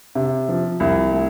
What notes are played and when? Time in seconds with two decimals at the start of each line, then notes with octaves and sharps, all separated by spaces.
0.15 C3
0.49 F3
0.80 C2
1.12 A3